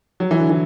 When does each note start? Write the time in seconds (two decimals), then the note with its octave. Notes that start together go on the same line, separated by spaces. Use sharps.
0.20 F#3
0.31 E3
0.40 D3
0.50 E3